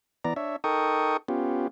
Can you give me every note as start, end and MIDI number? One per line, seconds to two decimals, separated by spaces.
0.25 0.34 52
0.25 0.34 59
0.25 0.34 74
0.25 0.34 82
0.36 0.56 62
0.36 0.56 73
0.36 0.56 76
0.64 1.17 63
0.64 1.17 69
0.64 1.17 70
0.64 1.17 79
0.64 1.17 85
0.64 1.17 87
1.28 1.68 59
1.28 1.68 61
1.28 1.68 65
1.28 1.68 67